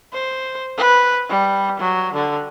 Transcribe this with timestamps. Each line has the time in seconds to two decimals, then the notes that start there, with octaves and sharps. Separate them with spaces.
0.13 C5
0.77 B4
1.29 G3
1.79 F#3
2.14 D3